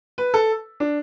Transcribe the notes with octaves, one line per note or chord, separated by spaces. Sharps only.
B4
A4
D4